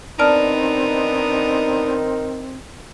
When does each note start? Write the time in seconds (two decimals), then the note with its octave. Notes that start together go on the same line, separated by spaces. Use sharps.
0.19 D#3 B3 C4 D4 D#4 D5 A5 F6